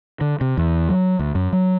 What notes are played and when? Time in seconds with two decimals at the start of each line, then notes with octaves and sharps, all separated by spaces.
0.21 D3
0.41 C3
0.57 E2
0.89 F#3
1.19 D2
1.35 F#2
1.52 F#3